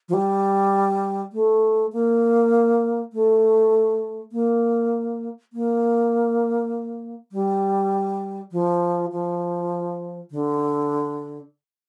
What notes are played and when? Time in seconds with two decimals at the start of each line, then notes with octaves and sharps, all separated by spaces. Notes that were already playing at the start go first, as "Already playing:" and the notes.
0.08 F3
0.13 G3
1.32 A3
1.93 A#3
3.13 A3
4.32 A#3
5.53 A#3
7.32 G3
8.52 F3
9.12 F3
10.31 D3